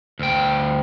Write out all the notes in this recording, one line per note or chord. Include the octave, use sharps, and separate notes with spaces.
D2 G5